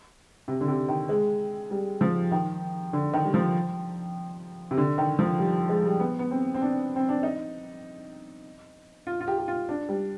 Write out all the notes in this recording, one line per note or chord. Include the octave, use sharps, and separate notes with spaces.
C3
D3
C3
D#3
G#3
G3
F3
D#3
D3
D#3
G3
F3
C3
D3
D#3
F3
G3
G#3
G3
B3
B3
C4
C4
D4
C4
D4
D#4
F4
F4
G4
G4
F4
D4
G3